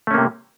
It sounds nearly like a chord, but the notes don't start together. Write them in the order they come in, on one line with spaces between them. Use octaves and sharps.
A3 C#4 A#3 C3